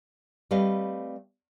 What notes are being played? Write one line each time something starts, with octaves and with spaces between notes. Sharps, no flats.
G3 A3 C4 B4 D#5 F5